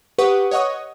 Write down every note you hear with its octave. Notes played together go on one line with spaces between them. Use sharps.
G4 B4 F#5 C#6 D#6
C#5 D#5 F#5 C#6 D#6